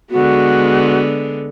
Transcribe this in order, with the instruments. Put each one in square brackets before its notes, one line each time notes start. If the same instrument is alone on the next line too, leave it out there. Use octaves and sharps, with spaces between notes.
[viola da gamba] D3 G#3 B3 [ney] F#4